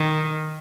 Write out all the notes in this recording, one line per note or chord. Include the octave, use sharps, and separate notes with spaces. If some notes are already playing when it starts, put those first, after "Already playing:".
Already playing: D#3